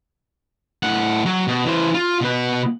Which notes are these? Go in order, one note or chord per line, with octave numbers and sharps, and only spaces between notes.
A2 F#5
F#3
B2
E3 C5
F4
B2 B4